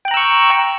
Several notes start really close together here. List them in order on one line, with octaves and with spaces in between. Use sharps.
G5 F#6 A#5 E6 C#6